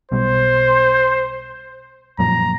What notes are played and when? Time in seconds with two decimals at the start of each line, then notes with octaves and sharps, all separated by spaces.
0.12 B1 B2 G3 C5
2.19 F#2 A#2 F3 A#5